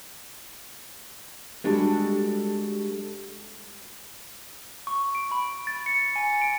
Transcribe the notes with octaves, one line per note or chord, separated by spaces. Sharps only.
G3 G#3 D4 F#4 A4
C#6
D7
B5
A6
C#7
G#5
D7